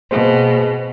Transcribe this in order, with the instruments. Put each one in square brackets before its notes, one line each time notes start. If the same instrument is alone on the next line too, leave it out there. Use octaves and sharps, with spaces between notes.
[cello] B2 [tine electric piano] A#3 G#4 C5